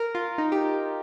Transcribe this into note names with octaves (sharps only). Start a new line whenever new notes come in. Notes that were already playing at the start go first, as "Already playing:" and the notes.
Already playing: A#4
F4
D#4
G4